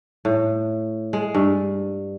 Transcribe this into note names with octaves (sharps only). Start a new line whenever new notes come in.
A2
G#3
G2